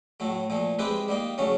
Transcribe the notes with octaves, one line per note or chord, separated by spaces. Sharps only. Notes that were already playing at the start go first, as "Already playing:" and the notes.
A2 F#3 A3
A#2 F3 A3
G#3 C4 E4 G4 B4
G3 A#3 D#4
C#3 F#3 A3 C#4